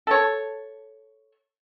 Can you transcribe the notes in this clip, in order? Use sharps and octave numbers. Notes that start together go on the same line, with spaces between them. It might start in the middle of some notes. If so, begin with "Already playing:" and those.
A4 C#5